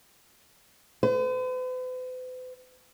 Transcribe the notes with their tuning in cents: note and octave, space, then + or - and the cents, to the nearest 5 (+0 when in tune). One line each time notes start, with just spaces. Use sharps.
B4 +45